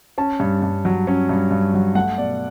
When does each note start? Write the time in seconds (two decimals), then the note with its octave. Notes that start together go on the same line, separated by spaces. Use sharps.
0.18 C#4 A5
0.40 G2
0.62 G2
0.85 F#3
1.07 C#4
1.29 G2
1.51 G2
1.74 F#3
1.95 A3 F#5
2.18 B2 D5